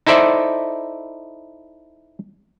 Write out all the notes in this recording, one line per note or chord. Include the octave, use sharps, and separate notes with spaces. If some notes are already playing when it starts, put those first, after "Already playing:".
D#4 E4 A4 C5 D5 E5